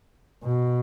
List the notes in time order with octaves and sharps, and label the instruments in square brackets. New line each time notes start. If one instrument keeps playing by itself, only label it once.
[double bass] B2